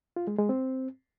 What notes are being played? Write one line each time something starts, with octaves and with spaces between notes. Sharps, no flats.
F4
G#3
G#3
C4